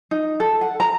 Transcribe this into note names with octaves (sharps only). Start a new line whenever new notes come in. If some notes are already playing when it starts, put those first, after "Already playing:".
D#4
A4
F#5
A#5